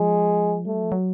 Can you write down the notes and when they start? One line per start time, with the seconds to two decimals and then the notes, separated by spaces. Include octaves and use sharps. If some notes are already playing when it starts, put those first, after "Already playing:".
Already playing: F3 G#3
0.66 G3 A3
0.75 F#3
0.84 F3
0.92 F#3